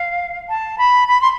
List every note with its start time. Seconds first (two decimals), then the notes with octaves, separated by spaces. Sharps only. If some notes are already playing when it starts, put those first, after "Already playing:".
Already playing: F5
0.49 A5
0.78 B5
1.08 B5
1.21 C6